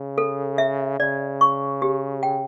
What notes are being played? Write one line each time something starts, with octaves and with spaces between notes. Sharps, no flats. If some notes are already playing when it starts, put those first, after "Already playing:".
Already playing: C#3
A4
E5
C#3 D5
C#6
G4
G5